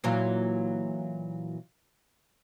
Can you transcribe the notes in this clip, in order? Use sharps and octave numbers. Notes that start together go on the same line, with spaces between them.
A#2 E3 F#3